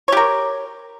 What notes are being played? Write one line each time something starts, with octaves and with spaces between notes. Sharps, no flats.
G4 A#4 C#5